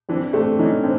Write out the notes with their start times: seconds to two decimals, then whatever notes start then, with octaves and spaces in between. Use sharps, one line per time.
0.09 E3 C4 D4
0.33 A3 C4 D4
0.59 E3 C#4 D#4
0.83 C4 D4